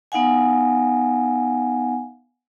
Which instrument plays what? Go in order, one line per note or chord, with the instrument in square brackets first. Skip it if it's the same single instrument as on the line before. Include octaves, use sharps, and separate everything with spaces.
[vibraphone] B3 D#4 F5 F#5 G#5